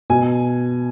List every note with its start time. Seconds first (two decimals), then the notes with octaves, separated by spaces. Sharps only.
0.10 B2 G#5